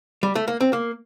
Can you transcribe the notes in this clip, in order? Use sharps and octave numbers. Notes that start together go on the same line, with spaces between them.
G3
A3
A#3
C4
A#3